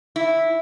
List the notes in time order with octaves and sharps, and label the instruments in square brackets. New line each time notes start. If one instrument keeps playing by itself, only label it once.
[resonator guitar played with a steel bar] E4